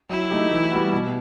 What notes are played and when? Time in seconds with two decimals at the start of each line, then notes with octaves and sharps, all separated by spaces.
0.10 F#3 E4
0.30 A3 D#4 G4
0.51 E3
0.72 G3 B3 F#4
0.93 B2